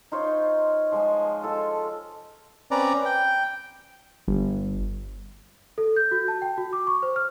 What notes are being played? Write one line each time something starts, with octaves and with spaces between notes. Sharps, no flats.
D#4 F4 C5 C#5
F3 G#3 D#5 G#5
F4 A4
C4 C#4 B4 D5 A#5
G5
G1
A4
G6
F#4
A5
G5
F#4
D6
C#6
C5
F6